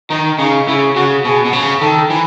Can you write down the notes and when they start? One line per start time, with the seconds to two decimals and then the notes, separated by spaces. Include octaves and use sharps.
0.10 D#3 D#4
0.39 C#3 D#4
0.68 C#3 E4
0.96 C#3 F#4
1.25 B2 G#4
1.45 B2
1.53 C#3
1.81 D#3 A4
2.10 E3